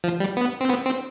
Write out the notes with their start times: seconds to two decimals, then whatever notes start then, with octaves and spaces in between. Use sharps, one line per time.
0.04 F3
0.20 G3
0.37 B3
0.61 C4
0.69 B3
0.86 C4